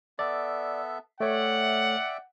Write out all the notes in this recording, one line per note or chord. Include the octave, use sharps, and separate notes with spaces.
B3 A4 D5 E5
A3 C#5 D5 E5 F#5 G5